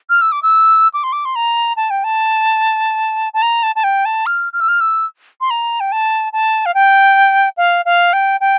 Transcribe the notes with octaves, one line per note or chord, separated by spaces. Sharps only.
F6
E6
D6
E6
D6
C6
D6
C6
A#5
A5
G5
A5
A5
A#5
A5
A5
G5
A5
F6
F6
E6
F6
E6
C6
A#5
G5
A5
A5
F5
G5
F5
F5
G5
G5